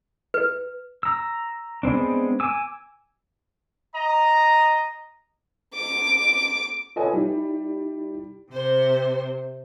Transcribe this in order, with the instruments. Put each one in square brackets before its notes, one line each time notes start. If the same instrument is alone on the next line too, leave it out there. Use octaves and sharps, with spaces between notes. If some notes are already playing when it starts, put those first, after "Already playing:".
[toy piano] B4
[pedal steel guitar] A#5 E6
G#3 B3 C4 D4
G#5 D6 E6
[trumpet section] D#5 A#5
[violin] D6
[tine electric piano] F4 B4 C#5 [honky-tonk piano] A4 D#5 G#5
[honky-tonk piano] G3 [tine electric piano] D#4 E4
[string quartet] C3 C5